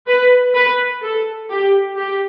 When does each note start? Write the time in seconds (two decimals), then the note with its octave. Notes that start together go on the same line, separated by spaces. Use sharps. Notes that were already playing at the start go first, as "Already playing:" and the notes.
0.08 B4
0.56 B4
1.03 A4
1.51 G4
1.98 G4